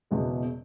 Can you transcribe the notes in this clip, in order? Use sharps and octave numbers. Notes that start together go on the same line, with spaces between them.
F#1 E2 B2 G#3